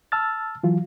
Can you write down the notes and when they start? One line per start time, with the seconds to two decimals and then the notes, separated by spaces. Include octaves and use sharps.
0.12 A5 E6 F6 A6
0.63 E3 F#3 F4